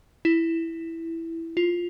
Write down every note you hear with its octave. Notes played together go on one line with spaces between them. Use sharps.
E4
F4